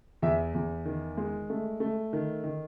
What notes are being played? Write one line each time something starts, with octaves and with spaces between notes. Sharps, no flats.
E2 E5
E2
D#3
G#3
A3
A3
D#3
D#3